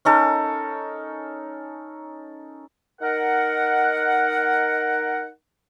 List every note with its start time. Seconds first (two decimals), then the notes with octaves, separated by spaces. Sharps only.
0.05 C#4 D#4 A4 A#4
3.02 D#4 A#4 F#5